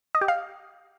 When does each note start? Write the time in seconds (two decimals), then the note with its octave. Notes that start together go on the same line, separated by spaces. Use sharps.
0.15 D#5
0.21 G4
0.28 F5